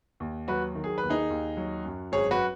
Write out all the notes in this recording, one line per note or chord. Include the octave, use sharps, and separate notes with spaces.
D#2
F#3 F#4 B4
D#3
G#4
B4
D#2
D#4 G#4
D#2
F#3
F#2
G#1 G#4 C#5
F#4 B4